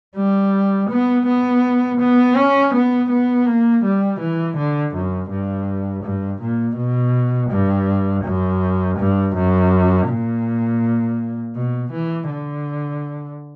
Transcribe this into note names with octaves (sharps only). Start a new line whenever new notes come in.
G3
B3
B3
B3
C#4
B3
B3
A#3
G3
E3
D3
F#2
G2
G2
A#2
B2
G2
F#2
G2
F#2
A#2
B2
E3
D3